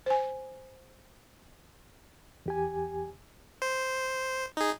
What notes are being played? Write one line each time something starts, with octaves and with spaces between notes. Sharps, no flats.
C5 G#5
E2 G4 G#5
C5
D#4 G#4